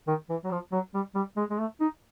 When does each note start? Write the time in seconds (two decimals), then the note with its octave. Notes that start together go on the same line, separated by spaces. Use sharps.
0.07 D#3
0.29 E3
0.44 F#3
0.51 F3
0.72 F#3
0.94 G3
1.15 G3
1.37 G#3
1.50 G#3
1.59 A3
1.81 D#4